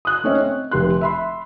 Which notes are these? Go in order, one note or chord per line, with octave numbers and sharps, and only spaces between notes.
D#6 F#6
A3 C4 C#4 C#5 D#5 E5
C4
F1 G4 C6 F#6
E5 B5 C6